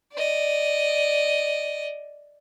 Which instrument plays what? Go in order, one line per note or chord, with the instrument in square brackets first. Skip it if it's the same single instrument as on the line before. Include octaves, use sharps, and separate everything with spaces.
[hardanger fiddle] D5 D#5